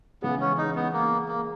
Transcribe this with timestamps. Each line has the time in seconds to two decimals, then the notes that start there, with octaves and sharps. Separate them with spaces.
0.22 C#3 E3 G#3 B3
0.40 C#4
0.58 D#4
0.76 B3
0.93 A#3
1.29 A#3